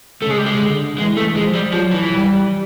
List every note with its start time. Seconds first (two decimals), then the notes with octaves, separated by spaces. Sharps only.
0.22 C#3 A3
0.30 G#3
0.38 G3
0.46 G#3
0.60 D3
0.98 E3 G#3
1.17 A3
1.36 F3 G#3
1.55 G3
1.74 F3 F#3
1.93 E3
2.12 G3